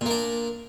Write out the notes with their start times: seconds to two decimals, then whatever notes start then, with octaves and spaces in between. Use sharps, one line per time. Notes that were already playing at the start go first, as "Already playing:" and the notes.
0.01 A#2
0.06 A#3
0.10 D4